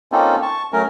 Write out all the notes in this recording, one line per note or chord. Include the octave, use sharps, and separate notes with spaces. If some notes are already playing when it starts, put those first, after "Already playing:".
A#3 C4 C#4 D#4 F4 A4
A5 C#6
F#3 A3 C#4 A#4